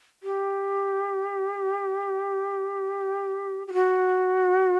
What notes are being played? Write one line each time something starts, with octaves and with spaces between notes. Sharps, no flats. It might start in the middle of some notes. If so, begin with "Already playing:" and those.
G4
G4
F#4